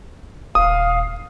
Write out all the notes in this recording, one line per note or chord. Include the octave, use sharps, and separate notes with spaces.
D#1 F5 D#6